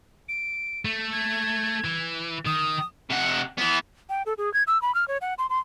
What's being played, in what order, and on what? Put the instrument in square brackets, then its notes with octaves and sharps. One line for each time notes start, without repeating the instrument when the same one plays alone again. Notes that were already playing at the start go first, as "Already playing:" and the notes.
[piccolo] D7
[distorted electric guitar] A3
[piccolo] G#6
[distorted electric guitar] E3
[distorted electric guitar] D#3 [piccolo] D#6
[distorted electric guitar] C3 F#5
E3 B3
[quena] G5
A4
G#4
G#6
E6
B5
F6
C#5
F#5
C6
C6